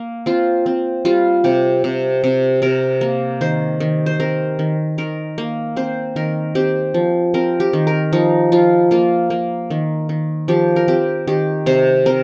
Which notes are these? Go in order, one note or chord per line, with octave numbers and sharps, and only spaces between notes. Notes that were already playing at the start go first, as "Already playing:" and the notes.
Already playing: A#3
C4 F4
C4
G3 F4
C3 G4
C3
C3
C3 A#4
A#3
D#3 C5
D#3
C5
C4 A#4
D#3
D#3 A#4
A#3
C4 C5
D#3 A#4
C4 G4
F3
C4 A#4
G4
D#3
A#4
F3 D#4
F3 F4
A#3 F4
A#3
D#3
D#3
F3 G4
A#4
C4 G4
D#3 G4
C3 C5
C4 A#4